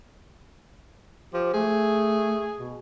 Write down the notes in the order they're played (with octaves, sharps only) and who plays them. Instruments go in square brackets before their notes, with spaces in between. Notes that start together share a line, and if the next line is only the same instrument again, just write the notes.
[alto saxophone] F3 [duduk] G4
[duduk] A3 [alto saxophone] G#4
[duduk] B2